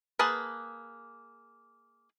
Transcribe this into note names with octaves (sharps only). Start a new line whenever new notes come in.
A#3 G#4 B4 A5